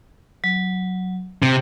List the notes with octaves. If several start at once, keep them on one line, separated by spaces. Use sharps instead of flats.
F#3
C3